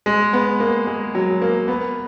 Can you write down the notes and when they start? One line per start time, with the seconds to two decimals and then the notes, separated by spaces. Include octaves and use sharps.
0.06 G#3
0.33 B3
0.60 A#3
0.87 G#3
1.15 F#3
1.42 A#3
1.68 B3